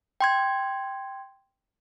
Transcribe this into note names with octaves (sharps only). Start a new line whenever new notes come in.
G5 C6 G#6